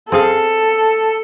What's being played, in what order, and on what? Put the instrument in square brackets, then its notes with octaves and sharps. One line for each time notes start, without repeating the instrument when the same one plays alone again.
[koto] C4 G#4 F5 [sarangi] A4